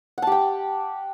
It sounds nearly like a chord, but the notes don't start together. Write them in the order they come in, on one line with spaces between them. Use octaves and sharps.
F#5 A5 G4 G5